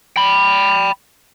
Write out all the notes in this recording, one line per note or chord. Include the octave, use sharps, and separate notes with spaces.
G5 B5